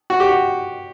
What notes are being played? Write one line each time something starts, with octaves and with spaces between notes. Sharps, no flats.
F#4
G4
F#4